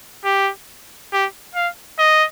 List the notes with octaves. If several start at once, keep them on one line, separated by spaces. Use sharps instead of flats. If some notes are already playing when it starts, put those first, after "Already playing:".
G4
G4
F5
D#5